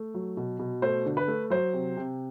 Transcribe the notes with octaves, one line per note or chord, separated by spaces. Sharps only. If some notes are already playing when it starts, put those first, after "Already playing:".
Already playing: A3
F#3
B2
B2
A3 C5
D3
B4
A3
F#3 C5
C3
C3